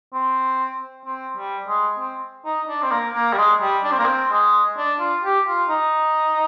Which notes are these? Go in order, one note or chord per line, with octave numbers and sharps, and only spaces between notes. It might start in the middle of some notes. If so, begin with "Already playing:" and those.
C4
C4
G3
G#3
C4
D#4
D4
C4
A#3
A#3
G3
G#3
G3
D4
C4
A#3
C4
G#3
D4
F4
G4
F4
D#4